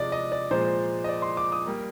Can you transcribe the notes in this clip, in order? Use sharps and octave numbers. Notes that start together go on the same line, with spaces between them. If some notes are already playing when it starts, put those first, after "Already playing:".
Already playing: C3 F3 G#3 D5 D#5
D#5
D5
A#2 F3 G#3 C5
D#5
D5
C6
D6
D#6
G3 A#3